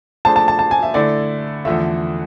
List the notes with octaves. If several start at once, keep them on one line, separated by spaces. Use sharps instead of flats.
F3 A3 D4 G#4 C5 A5
A5
A5
A5
G#5
E5
D3 A3 E4 D5
E2 D3 F3 A3 E5